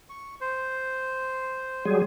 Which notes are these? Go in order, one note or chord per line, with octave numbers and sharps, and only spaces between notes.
C#6
C5
F#3 G3 G#4